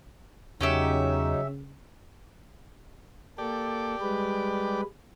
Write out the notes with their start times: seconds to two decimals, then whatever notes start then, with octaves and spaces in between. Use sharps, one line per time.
0.61 E2 C#3 F#3 C#4 D#4 G4 E5
3.38 A#3 G4 A4 D5
4.01 G3 G#3 B4